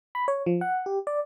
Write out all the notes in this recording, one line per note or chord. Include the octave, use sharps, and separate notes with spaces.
B5
C#5
F3
F#5
G4
D5